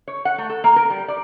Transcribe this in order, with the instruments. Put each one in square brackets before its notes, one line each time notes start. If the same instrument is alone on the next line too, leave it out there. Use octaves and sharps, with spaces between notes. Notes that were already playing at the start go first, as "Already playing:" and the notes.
[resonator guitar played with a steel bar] C#5
F#5
A3
A4
A#3
A#4
G3
D5